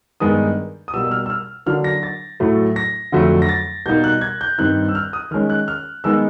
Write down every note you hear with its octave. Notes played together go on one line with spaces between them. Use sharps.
G2 D#3 G#3 B3 D#4 D#6
D#6
B2 G3 A#3 E6
E6
F6
E6
F6
D3 F#3 A#3 D4 F6
A#6
A6
A2 F#3 A3
A#6
F2 D3 F#3 A3
A#6
A6
B2 G3 A#3 D#4 G6
F#6
G#6
G6
G2 D#3 G3 C4 D#4 F#6
E6
F6
D#6
D#3 G#3 C#4 F6
F#6
F6
D#3 G#3 B3 D#4 E6